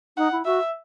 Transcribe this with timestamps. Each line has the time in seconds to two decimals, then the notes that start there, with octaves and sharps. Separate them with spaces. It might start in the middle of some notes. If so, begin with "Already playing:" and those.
0.17 D#4 F#5
0.32 E4
0.45 F#4 E5